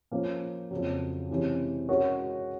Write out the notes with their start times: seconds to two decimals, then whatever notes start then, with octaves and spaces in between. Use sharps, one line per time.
0.11 F3 A#3 C#4
0.71 F2 C#3 F#3
1.30 C3 E3 G#3 C#4
1.89 G#3 C#4 F#4 A#4 C#5